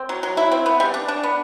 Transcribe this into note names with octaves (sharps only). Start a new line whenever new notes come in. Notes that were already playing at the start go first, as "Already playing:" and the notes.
Already playing: C4
F#3
F#3
E4
C4
B3
G3
D4
D4
B3